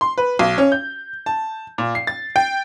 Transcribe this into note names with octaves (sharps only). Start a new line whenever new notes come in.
C6
B4
B1
C#4
G6
A5
A#2
C7
A6
G5